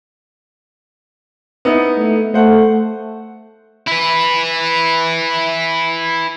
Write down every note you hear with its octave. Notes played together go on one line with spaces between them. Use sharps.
B3 D#4 E4
A3
A3 C5 F#5
E4 B4